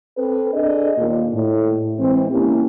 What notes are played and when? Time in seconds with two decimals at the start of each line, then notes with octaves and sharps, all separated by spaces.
0.17 C4 A4 B4
0.54 D4 G#4 A4 D5 D#5
0.98 D#2 A#2 A#3
1.34 A2
1.99 E3 G#3 C4
2.32 A#3 C#4 E4 G4